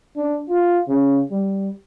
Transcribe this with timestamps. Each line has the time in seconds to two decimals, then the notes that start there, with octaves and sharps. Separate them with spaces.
0.16 D4
0.49 F4
0.88 C#3
1.31 G3